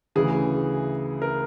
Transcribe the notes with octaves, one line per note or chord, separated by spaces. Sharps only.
D2 C#3 E3 G#4
A#4